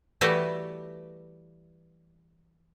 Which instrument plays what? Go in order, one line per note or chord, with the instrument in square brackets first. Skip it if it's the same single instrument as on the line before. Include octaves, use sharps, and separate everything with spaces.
[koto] E3 G3 A3 F#4 G4 B4